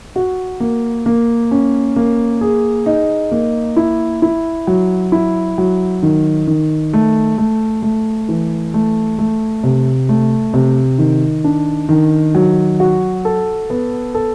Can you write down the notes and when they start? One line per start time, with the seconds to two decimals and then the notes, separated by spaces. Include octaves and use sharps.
0.16 F#4
0.60 A#3
1.06 A#3
1.51 C#4
1.96 A#3
2.41 G#4
2.86 D#4
3.31 A#3
3.76 E4
4.22 E4
4.67 F#3
5.12 E4
5.58 F#3
6.03 D#3
6.47 D#3
6.93 A3
7.38 A3
7.83 A3
8.29 E3
8.74 A3
9.18 A3
9.64 C3
10.09 A3
10.54 C3
10.98 D#3
11.44 D4
11.89 D#3
12.35 F#3
12.80 F#4
13.25 A4
13.70 B3
14.14 A4